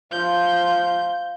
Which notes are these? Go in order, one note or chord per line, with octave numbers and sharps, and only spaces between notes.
F3 G6